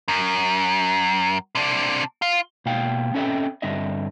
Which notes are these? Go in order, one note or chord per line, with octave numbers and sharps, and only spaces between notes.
F#2
C3 D4
F4
B2 A#3 F5 G5
C4 C#4 A4 D#5 E5 G5
G2 D3 C4 D#5 E5